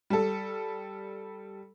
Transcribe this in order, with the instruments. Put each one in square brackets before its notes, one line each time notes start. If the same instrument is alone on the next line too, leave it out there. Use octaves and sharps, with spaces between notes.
[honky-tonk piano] G3 A4